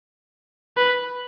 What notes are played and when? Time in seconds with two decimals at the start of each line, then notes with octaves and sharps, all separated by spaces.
0.77 B4